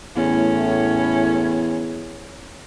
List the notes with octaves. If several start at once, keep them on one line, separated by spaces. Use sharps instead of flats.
E2 A2 C#4